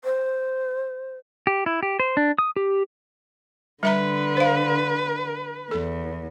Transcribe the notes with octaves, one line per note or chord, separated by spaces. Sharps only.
C5
G4
E4
G4
C5
D4
D#6
G4
D3 G3 B4 E5 A#5
C5 F5
E2 A4